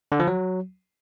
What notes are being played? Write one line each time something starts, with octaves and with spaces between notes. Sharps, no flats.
D3
F3
F#3